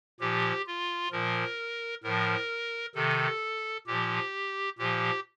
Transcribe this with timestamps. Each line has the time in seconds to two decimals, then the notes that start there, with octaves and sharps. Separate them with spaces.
0.20 A#2 F3 G4
0.67 F4
1.12 A#2 F3 A#4
2.03 A2 F3 A#4
2.95 C3 D#3 A4
3.87 A#2 F3 G4
4.78 A#2 F3 G4